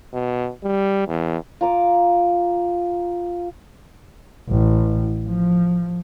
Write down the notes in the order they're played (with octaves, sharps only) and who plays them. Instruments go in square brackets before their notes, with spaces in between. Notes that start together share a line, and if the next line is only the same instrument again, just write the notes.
[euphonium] B2
G3
E2
[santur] F4 A#5 D6
[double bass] A1
F3